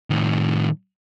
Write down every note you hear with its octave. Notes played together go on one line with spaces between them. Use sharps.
A2 D#3